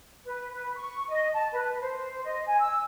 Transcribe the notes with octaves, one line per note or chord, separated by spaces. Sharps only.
B4
B4
C#6
D#5
A5
B4
C5
D#5
G#5
E6